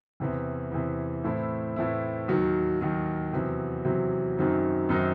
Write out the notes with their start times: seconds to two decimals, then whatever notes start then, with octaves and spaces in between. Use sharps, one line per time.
0.20 E2 C3 E3
0.72 E2 C3 E3
1.24 A2 E3 A3 C4 E4
1.76 A2 E3 A3 C4 E4
2.28 D#2 D#3 F#3
2.81 D#2 D#3 F#3
3.33 E2 C3 F#3
3.85 E2 C3 F#3
4.37 F#2 D#3 F#3 C4 D#4
4.89 F#2 D#3 F#3 C4 D#4